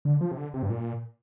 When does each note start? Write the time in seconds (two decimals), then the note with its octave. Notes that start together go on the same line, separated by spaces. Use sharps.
0.05 D3
0.21 F3
0.31 C3
0.37 D3
0.54 C3
0.63 G2
0.70 A#2